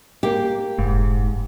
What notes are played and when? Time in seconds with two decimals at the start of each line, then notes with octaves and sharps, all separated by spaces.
0.23 A#3 G4
0.79 F1 G#2